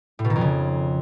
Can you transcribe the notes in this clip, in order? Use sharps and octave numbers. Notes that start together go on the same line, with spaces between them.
A2
B2
D#3
F2
C#3